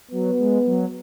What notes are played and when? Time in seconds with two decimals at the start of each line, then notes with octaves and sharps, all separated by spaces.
0.11 F#3 B3
0.39 G#3
0.66 F#3